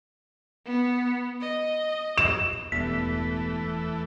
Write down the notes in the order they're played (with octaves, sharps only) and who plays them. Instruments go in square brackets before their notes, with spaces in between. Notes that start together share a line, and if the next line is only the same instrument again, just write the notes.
[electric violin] B3
D#5
[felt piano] E7
[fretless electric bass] E1 G2 B3 [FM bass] E2 [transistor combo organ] E3 A3 [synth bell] B6